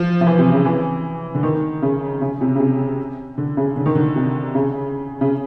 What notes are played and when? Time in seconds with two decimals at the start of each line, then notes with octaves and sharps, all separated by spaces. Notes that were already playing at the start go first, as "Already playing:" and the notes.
Already playing: F3
0.21 F3
0.26 E3
0.39 C3
0.52 C#3
0.65 E3
1.35 D3
1.43 D#3
1.82 C#3
2.21 C#3
2.41 C3
2.56 C#3
2.60 C3
3.38 D3
3.57 C#3
3.76 D3
3.86 D#3
3.95 D3
4.16 C3
4.55 C#3
5.21 C#3